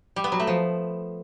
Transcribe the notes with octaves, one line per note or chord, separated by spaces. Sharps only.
G3
B3
F#3
A3
F3